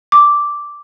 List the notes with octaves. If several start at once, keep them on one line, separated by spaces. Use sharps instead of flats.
D6